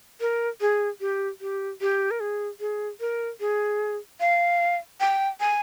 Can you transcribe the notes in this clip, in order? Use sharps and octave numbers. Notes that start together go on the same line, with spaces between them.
A#4
G#4
G4
G4
G4
A#4
G#4
G#4
A#4
G#4
F5
G5
G#5